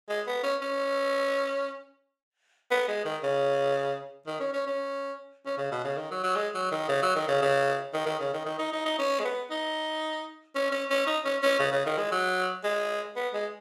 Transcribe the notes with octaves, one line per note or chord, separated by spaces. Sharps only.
G#3
B3
C#4
C#4
B3
G#3
D#3
C#3
D#3
C#4
C#4
C#4
C#4
C#3
B2
C#3
D#3
F#3
F#3
G#3
F#3
D#3
C#3
F#3
D#3
C#3
C#3
D#3
D#3
C#3
D#3
D#3
D#4
D#4
D#4
C#4
G#3
B3
D#4
C#4
C#4
C#4
D#4
C#4
C#4
C#3
C#3
D#3
G#3
F#3
G#3
B3
G#3